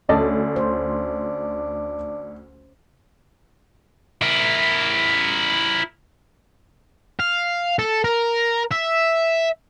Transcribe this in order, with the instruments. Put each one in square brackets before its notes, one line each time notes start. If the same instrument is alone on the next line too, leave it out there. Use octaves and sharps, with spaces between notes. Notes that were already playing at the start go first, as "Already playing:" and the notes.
[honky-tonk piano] D2 [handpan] C#4 [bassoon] D4 [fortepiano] D5 D#5 A5
[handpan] C5
[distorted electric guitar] E4 A#4
F5
A4
A#4
E5